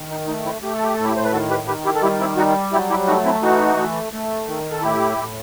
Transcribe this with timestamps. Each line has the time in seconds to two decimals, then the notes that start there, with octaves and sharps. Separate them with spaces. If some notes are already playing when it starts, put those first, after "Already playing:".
Already playing: D#3
0.11 D#4
0.27 A3 D#4
0.45 C4 E4
0.62 A3 G4
0.73 A4
0.83 G4
0.94 A2 A4
1.04 E4 G4
1.16 C5
1.25 B4
1.32 D#3 F#4 A4
1.50 G4 B4
1.67 D#3 G4 B4
1.85 E4 G4
1.95 A4
2.02 G3 E4 G4
2.20 C4 E4
2.37 G3 D#4 F#4
2.72 F#3 E4 G4
2.90 E4 G4
3.07 A3 D#4 F#4
3.24 C4 E4
3.42 E3 D#4 F#4
3.77 A3
4.13 A3
4.47 D#3
4.71 A4
4.82 A2 E4 G4
5.18 A2